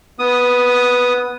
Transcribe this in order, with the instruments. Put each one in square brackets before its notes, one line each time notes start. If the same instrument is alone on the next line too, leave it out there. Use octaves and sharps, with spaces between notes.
[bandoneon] B3 D#6